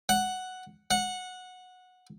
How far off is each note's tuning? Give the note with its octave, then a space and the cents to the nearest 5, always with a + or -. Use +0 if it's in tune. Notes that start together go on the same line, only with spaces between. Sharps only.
F#5 +0
F#5 -15